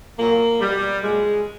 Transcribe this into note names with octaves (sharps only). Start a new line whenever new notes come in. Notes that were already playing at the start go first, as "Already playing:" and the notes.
A#2 F#3 A#3
B2 F#3 G3
A#2 F#3 G#3